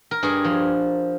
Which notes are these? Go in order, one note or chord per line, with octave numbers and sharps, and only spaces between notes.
A#4
G2 G#4
F3